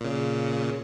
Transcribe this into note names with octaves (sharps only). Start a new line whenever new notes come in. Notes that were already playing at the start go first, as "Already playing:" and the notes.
A#2 C#3